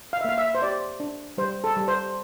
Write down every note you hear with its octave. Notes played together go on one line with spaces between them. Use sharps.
F5
E5
A#3 F5
E5
C5
G4 D5
D4
G3 C5
A4
G3
C5